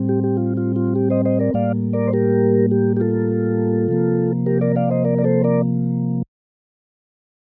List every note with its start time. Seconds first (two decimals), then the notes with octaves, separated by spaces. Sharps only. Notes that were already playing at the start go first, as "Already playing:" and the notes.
Already playing: A2 G3 C4
0.09 G4
0.24 G4
0.37 F4
0.57 F4
0.76 F4
0.96 G4
1.10 C5 D#5
1.25 C5 D#5
1.39 A#4 D5
1.54 A2 G3 A#3 D5 F5
1.93 A#4 D5
2.08 C5
2.13 G4 A#4
2.71 G4
2.97 G4
3.00 F4 A4
3.89 C3 F3 A#3
4.46 G4 A#4
4.61 A#4 D5
4.76 D5 F5
4.90 C5 D#5
5.05 A#4 D5
5.18 D5
5.24 A4 C5
5.44 A#4 D5